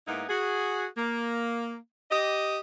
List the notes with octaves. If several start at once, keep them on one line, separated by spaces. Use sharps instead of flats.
G#2 A#3 B3 D#4 E4
F#4 G#4
A#3
G4 D#5